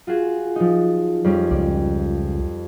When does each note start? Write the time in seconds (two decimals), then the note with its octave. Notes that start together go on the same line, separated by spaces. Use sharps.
0.07 F4 F#4 G#4
0.56 F3 D#4
1.24 F2 G3 C#4
1.51 C#2 D5